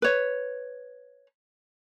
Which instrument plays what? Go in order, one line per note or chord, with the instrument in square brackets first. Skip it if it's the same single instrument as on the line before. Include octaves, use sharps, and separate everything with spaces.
[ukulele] B4 C#5